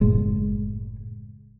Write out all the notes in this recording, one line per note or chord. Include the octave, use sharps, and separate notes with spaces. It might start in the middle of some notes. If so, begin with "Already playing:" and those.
F#1 A2 G#3